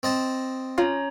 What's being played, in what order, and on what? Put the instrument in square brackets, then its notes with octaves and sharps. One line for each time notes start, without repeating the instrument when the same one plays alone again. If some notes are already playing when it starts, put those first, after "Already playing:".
[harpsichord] C4 D#5 A5
[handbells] C#4 C#5 A#5 [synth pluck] F4